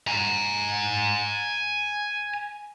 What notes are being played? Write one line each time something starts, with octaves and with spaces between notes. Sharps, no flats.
G#5 A#5